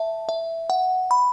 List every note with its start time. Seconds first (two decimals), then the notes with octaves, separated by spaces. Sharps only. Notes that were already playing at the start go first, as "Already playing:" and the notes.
Already playing: E5 A5
0.29 E5
0.70 F#5
1.11 B5